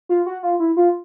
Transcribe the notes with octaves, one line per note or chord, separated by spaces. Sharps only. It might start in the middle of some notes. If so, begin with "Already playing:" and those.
F4
F#4
F4
E4
F4